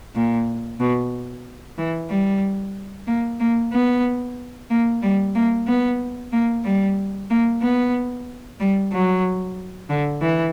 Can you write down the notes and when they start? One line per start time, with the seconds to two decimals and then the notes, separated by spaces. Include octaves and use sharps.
0.15 A#2
0.80 B2
1.78 E3
2.10 G3
3.07 A#3
3.40 A#3
3.72 B3
4.70 A#3
5.02 G3
5.35 A#3
5.67 B3
6.33 A#3
6.65 G3
7.30 A#3
7.62 B3
8.60 G3
8.92 F#3
9.90 D3
10.22 E3